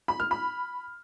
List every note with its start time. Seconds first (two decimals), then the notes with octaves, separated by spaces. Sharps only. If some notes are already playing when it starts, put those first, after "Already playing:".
0.08 B5
0.20 F6
0.31 B5